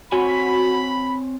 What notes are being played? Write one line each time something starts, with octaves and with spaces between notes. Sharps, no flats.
C4 F#4 C#5 G#5 B5